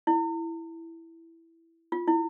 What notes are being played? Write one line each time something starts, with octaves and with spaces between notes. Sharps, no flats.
E4
F4
E4